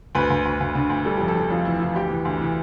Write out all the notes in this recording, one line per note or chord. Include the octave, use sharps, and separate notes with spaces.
D2 B4
D2
D2
D2
D3
D2
G3 A4
F2 G4
A4
F2
F2 F4
E3 E4
E3 F4
D2 G4
E3
D2
E3